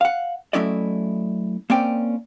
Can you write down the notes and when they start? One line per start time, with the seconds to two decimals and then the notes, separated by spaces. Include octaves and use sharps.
0.01 F5 F#5
0.53 F#3 A3 C#4 E4 D5 D#5
1.70 A#3 C4 C#4 D5 G5